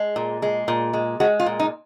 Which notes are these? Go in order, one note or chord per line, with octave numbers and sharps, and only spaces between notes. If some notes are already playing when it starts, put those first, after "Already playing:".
Already playing: G#3
A#2
G#3
A#2
G#3
G#3 F#4
F4
A#2
D#4